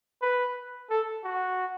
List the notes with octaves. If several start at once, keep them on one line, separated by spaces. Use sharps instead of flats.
B4
A4
F#4